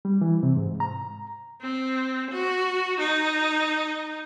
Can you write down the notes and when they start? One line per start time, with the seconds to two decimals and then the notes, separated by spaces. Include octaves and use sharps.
0.05 G3
0.21 E3
0.43 C3
0.56 G#2
0.80 A#5
1.62 C4
2.31 F#4
3.00 D#4